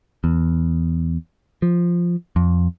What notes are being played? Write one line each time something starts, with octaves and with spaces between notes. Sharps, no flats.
E2
F3
F2